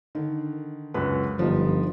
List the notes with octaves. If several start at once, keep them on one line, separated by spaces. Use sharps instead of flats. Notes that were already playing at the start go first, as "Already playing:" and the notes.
D3 D#3
C#2 F#2 B4
G1 F3 D#4